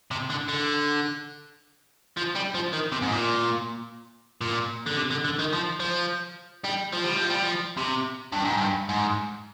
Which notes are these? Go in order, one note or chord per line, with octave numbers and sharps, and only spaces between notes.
C3
D3
D3
F3
G3
F3
D#3
C3
G#2
A#2
A#2
D3
C3
D3
D3
D#3
F3
F3
G3
F3
G3
F3
G3
F3
C3
G2
G#2
G2
G#2